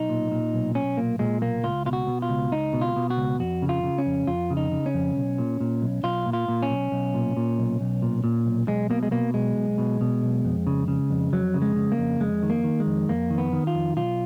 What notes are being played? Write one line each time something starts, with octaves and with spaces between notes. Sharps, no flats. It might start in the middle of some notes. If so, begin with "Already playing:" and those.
Already playing: B1 D#4
A#2
A#2
B1
B1 C#4
A#2 A#3
A#2 G#3
B1 A#3
C#2 F4
B2 F4
F#4
B2
F4
C#2
C#2 D#4
B2
F4
B2
F#4
C#2
F2 F#4
C#3
F4
C#3
C#4
F2
F2 F4
C#3
D#4
C#3
C#4
F2
B1
A#2
A#2
B1
B1 F4
A#2
F4
A#2
C#4
B1
B1
A#2
A#2
B1
B1
A#2
A#2
B1
B1 G#3
B2 A#3
G#3
B2 A#3
B1 G#3
B1
B2
B2
B1
F2
C#3
C#3
F2
F2 F#3
C#3
G#3
C#3
A#3
F2
F2 G#3
D#3
A#3
D#3
G#3
F2
F2 A#3
D#3
B3
D#3
F4
F2
B1 F4